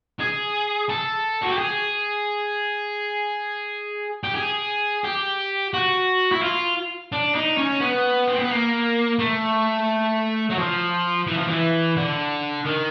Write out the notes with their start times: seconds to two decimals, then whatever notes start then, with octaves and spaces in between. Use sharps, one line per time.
0.20 G#4
0.89 A4
1.42 F#4
1.50 G4
1.58 G#4
4.23 G4
4.35 G#4
5.04 G4
5.74 F#4
6.32 E4
6.42 F4
7.12 D4
7.35 D#4
7.58 C#4
7.81 B3
8.28 C4
8.39 B3
8.50 A#3
9.19 A3
10.50 F#3
10.58 F3
11.27 E3
11.37 F3
11.47 E3
11.97 D3
12.65 D#3